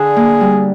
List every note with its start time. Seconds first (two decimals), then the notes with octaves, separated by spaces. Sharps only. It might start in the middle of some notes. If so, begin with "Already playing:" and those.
Already playing: D3 G#4
0.16 A#3
0.41 G3